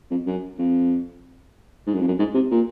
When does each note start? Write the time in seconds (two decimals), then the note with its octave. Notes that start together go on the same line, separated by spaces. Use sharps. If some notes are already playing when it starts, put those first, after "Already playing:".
0.11 F2
0.26 F#2
0.58 F2
1.87 G#2
1.94 F#2
2.01 F2
2.08 F#2
2.19 G#2
2.34 C3
2.51 A#2